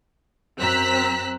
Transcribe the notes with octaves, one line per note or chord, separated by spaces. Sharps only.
F#2 C4 A#5 E6 F#6 B6